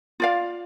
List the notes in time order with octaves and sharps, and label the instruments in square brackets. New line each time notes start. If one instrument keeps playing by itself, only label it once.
[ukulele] F4 D5 F5